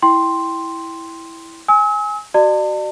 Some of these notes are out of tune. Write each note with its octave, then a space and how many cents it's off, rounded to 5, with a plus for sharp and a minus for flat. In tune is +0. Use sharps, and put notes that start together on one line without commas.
E4 +0 G5 +0 C6 +0
G#5 +0 E6 -45
F#4 +25 D5 +40 A5 +45